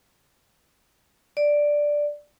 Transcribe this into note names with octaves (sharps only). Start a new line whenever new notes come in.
D5